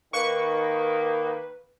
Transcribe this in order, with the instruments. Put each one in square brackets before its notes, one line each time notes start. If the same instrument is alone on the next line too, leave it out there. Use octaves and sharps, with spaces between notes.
[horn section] D#3 A#3 [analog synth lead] B4 [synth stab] C#6